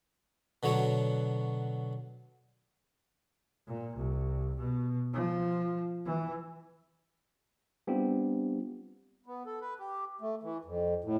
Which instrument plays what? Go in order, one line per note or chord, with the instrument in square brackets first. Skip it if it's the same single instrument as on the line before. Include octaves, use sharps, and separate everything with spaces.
[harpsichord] B2 D3 F#3 C#5
[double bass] A#2
C2
B2
F3
E3
[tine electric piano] G3 B3 C4 D4 F4 G4
[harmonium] B3
A4
B4
G4
A3
E3
F2
A2